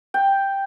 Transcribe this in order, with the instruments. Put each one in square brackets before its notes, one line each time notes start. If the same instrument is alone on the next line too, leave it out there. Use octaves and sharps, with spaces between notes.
[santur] G5